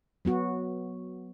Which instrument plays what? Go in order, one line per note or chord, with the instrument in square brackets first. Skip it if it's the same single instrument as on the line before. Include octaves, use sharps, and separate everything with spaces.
[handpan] F#3 B3 F#4